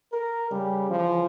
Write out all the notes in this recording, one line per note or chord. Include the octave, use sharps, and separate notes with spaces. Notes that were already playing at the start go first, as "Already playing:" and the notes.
A#4
C#3 G3
C#3 E3 F3